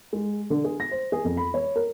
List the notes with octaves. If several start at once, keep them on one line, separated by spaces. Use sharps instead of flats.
G#3
D3
G#4
A#6
C5
G#4
F2
B5
C#5
A#4